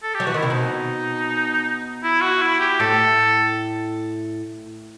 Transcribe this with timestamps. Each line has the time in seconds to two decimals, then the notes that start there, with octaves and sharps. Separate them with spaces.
0.03 A4
0.15 G4
0.20 F#3
0.27 E3 F#4
0.34 D#3
0.38 C3 E4
0.50 B2 D#4
2.04 E4
2.22 F#4
2.42 E4
2.60 G4
2.80 A2 A4